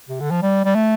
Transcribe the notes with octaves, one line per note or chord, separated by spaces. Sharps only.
C3
D3
F3
G3
G3
A3